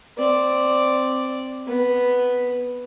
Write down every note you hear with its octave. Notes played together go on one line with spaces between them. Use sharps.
C4 D5
B3